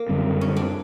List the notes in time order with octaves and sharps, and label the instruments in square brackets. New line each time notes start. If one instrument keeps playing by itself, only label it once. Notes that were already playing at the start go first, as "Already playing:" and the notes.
Already playing: [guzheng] A#3
[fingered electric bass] F#2 D3 G3 C4
[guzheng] C#4
D4